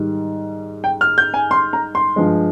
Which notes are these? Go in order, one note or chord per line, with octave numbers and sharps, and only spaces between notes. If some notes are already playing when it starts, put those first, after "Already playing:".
Already playing: G#2 D#3 G3
G5
F6
G6
G#5
C6
A#5
C6
G2 F3 G#3